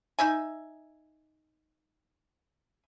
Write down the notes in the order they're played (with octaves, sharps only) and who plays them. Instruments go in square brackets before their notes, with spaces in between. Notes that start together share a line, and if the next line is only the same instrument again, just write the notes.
[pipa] D#4 E5 G#5